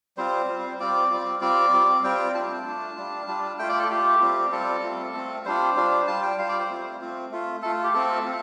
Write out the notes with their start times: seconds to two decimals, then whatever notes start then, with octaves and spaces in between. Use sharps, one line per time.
0.17 G3 C4 F4 C5
0.49 G3 C4 F4
0.79 G3 C4 F4 D5
1.10 G3 C4 F4
1.41 G3 C4 F4 D5
1.73 G3 C4 F4
2.04 G3 C4 F4 G5
2.34 A3 D4 F4 A5
2.65 A3 D4 F4
2.97 G3 D4 F4
3.27 G3 D4 F4
3.59 A3 F4 G5
3.69 D5
3.79 A4
3.90 A3 F4 G4
4.20 G3 C4 F4
4.52 G3 C4 F4 A4
4.83 A3 C4 F4
5.14 A3 C4 F4
5.45 G3 D4 F4 C5
5.76 G3 D4 F4
6.07 G3 F4 A5
6.22 G5
6.38 G3 F4 F5
6.49 D5
6.59 C5
6.69 A3 C4 F4
7.01 A3 C4 F4
7.31 A3 F4
7.62 A3 F4 A4
7.84 G4
7.94 A3 C4 F4 A4
8.25 C4 F4